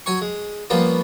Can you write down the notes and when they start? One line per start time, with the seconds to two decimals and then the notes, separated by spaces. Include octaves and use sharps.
0.06 F#3 C#5 G#5 C#6
0.21 G#3
0.70 F3 G3 A#3 B3 C#4 F4